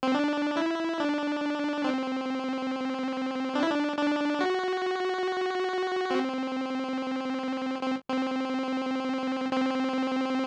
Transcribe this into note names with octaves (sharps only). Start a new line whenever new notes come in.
C4
D4
E4
D4
C4
D4
E4
D4
D4
F#4
C4
C4
C4
C4